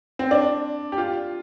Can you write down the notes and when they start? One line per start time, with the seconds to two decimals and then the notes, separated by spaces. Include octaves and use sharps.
0.19 C4
0.31 D4
0.92 G4
0.98 F4